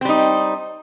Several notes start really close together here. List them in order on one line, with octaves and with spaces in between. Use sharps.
C4 G3 D#4